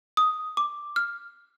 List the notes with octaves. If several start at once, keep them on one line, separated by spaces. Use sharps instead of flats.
D#6
D6
F6